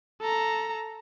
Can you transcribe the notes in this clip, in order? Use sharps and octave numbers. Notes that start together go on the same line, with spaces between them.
A4 A#5